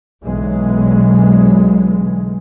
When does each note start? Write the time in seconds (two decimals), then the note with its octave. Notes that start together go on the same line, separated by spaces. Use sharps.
0.24 B1 D3 E3 F#3 G#3